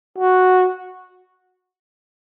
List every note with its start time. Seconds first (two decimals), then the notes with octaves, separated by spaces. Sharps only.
0.18 F#4